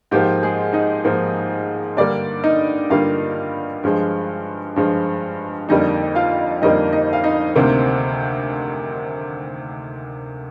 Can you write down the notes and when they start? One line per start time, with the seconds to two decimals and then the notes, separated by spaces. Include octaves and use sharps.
0.11 G#2 F3 A#3 G4
0.43 G#3 G#4
0.73 D#4 D#5
1.04 G#2 F3 A#3
1.97 G2 D3 G3 A#3 D4 D5
2.44 D#4 D#5
2.90 G2 D3 G3 A#3 F4 F5
3.83 G2 F3 G#3
4.76 G2 F3 G#3
5.69 F2 D3 G3 A#3 D#4 D#5
6.15 F4 F5
6.62 F2 D3 G3 A#3 D#4 D#5
6.93 D#4 D#5
7.13 F5
7.24 D#4 D#5
7.55 D2 C3 D#3 A#3 C4 C5